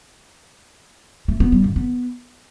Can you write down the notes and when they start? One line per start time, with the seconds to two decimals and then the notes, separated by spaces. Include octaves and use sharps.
1.28 A3
1.40 B3
1.52 G3
1.64 D3
1.76 B3